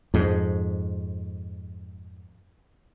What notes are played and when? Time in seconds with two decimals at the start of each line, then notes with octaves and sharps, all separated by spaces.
0.14 F2 G#2